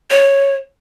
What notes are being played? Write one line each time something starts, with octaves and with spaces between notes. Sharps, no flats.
C#5